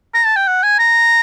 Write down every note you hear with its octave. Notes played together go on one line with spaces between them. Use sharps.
A#5
A5
G5
F#5
G#5
A#5